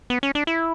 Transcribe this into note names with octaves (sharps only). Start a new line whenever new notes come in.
B3
C#4
D4
E4